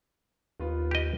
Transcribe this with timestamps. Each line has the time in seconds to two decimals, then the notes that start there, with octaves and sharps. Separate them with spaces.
0.60 D#2 B3 F4
0.91 G4 D#5